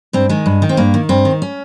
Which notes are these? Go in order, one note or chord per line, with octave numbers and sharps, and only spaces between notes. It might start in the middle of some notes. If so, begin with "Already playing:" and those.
G2 C4
D#3 G#3
G2
D#3
C4
G2 A#3
D#3
G2 C4
D#3
C#4